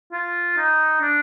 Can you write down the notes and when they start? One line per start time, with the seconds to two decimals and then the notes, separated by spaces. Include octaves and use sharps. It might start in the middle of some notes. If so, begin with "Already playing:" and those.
0.13 F4
0.57 D#4
1.01 D4